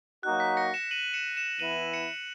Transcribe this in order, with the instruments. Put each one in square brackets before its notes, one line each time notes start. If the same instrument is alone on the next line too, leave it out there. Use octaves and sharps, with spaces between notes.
[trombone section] F#3 A#3 D#4 F#4 [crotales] F#6
[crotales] B6
A#6 C#7
C#7 E7
D#7 F#7
C#7 E7
C#7 E7
[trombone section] E3 B3 E4 [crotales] D#7 F#7
[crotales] C#7 E7